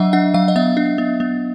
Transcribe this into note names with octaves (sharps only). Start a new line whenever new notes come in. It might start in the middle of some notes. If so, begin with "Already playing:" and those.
Already playing: F#3 D4 D#5 E5 F#5
D4 F#5
F#3 F5
D#5
B3 E5
D4
B3
B3